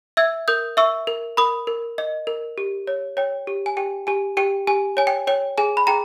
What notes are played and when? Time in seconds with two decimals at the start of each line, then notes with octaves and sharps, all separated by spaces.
0.17 E5 E6 G#6
0.48 A#4 D#6 G6
0.77 E5 C#6 E6
1.07 A#4
1.37 A#4 B5 D#6
1.67 A#4
1.98 D#5
2.27 A#4
2.58 G4
2.87 C#5
3.17 C#5 G5
3.47 G4
3.66 G#5
3.77 G4 G5
4.07 G4 G#5
4.37 G4 G5
4.67 G4 G#5
4.97 C#5 G#5
5.07 G5
5.27 C#5 G5
5.58 G#4 G#5
5.77 B5
5.87 G#4 G5 A#5